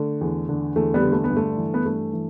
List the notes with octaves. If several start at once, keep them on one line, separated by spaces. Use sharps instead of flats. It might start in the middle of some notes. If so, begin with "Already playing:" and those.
Already playing: D3 A3
E2
D3
E2 A3
G3 B3
D3
A3
B3
G2
A3
E3
B3
G2 A3
E3